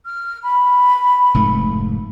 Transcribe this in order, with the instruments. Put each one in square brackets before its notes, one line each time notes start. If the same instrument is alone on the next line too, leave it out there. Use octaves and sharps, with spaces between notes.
[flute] F6
B5
[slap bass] F1 G#2 A3